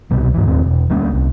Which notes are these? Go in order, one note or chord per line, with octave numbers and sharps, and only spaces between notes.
C2 B2 G3
G#2 E3
D#1 D#2 C4
E1
D2 G3 A#3 C#4
C2